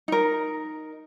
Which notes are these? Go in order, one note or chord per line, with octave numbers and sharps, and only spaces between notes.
D#4 A#4